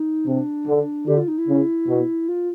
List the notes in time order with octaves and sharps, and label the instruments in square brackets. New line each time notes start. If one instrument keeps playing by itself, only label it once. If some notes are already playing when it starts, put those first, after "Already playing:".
Already playing: [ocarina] D#4
[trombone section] C3 [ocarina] D4
[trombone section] D3
[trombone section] D3 [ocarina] G4
[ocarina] F4
D#4
E4
[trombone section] C#3
B2
[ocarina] F4